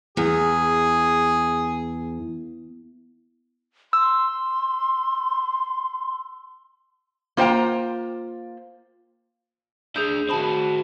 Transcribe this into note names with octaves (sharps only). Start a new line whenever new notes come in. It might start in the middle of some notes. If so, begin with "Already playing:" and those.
E2 G#4
C6 E6
A#3 F4 C5 F#5 G5 A#5
D4 G#4 E5 D#6 G6
C4 F#4 A5 B5 D#6